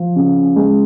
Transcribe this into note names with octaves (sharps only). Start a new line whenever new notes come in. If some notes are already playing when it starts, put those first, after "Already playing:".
Already playing: F3
C#3
G#3